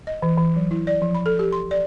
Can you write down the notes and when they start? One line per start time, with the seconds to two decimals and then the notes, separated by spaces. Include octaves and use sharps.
0.07 D#5
0.22 E3
0.38 E3
0.56 F#3
0.71 E4
0.87 D5
1.02 F3
1.14 B5
1.26 A4
1.39 G4
1.52 C6
1.71 D5